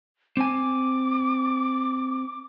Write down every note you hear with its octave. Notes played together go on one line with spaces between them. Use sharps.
C4 G#5 D6